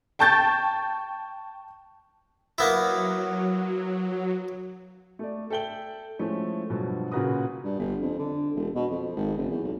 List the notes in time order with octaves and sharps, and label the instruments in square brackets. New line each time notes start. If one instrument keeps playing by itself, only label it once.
[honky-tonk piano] G5 A5 C#6 G6 A6
[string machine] F#3 [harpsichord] A#3 B3 E4
[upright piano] A3 D5
A4 E5 G5 F#7 G7
F3 G#3 A3 C#4 E4
G2 B2 F3 F#3
A#2 C#3 F#4 B4 A#5 D#6
[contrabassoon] G2
G1
F2
D3
E1
B2
F2
G#1
F#1
E2
B1